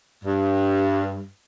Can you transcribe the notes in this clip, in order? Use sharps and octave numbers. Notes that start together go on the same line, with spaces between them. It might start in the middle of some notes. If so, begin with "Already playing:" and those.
G2